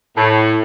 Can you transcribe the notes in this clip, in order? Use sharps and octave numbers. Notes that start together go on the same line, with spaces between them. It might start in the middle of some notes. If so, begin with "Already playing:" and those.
A2